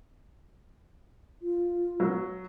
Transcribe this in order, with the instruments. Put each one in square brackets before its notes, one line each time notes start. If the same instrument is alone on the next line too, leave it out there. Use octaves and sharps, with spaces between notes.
[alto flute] F4
[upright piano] F#3